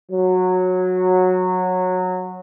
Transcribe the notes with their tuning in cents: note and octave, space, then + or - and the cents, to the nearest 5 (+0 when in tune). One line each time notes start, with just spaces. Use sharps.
F#3 -15